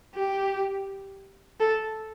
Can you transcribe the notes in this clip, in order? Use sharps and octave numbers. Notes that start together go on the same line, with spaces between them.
G4
A4